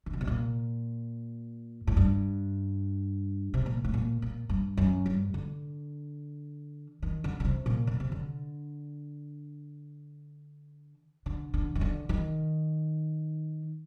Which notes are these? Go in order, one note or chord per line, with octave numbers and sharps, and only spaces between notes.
D#3
D3
C3
A#2
A2
G2
C3
A#2
A2
A#2
A#2
G2
F#2
G2
D3
D#3
D3
D3
C3
A#2
D3
C3
D3
D3
D3
D#3
D3
D#3